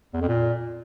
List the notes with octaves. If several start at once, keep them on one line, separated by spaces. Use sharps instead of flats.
E2
F2
A#2